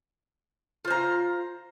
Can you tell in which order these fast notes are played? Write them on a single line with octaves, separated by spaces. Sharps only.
F4 C5 A#5